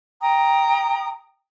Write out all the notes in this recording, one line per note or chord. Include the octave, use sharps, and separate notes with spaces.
G5 A#5 D#6